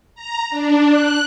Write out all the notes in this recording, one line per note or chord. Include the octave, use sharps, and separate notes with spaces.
A#5
D4
F#6